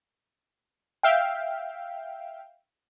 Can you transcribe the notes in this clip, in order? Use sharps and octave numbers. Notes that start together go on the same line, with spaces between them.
E5 F5 G5